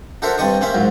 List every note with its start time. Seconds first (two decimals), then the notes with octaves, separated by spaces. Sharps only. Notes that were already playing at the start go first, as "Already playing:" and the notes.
0.22 D4 F#4 A4 A#4 C5 E5
0.38 G2 C4 D5 D#5 C#6 D#6
0.61 A#3 C#4 C5 E5
0.74 A#1 G#2 F#3